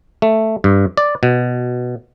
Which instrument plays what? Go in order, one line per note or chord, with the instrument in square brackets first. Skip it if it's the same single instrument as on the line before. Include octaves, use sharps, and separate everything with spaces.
[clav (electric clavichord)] A3
G2
D5
B2